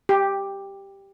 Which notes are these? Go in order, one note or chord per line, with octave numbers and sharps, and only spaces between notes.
G4